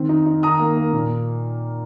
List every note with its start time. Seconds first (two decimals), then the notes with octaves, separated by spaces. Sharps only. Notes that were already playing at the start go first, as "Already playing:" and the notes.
Already playing: D#3 C4
0.09 D#4
0.26 D#4
0.43 D#3 A#5 D#6
0.59 A#3
0.77 A#3
0.93 A#2